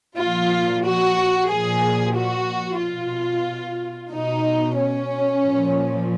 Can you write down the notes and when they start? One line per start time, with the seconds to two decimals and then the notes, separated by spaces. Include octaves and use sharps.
0.18 A#2 F3 F4
0.84 F#4
1.49 A#2 F3 G#4
2.15 F#4
2.81 B2 F4
4.12 B2 D#4
4.78 C#4
5.43 A#2 F3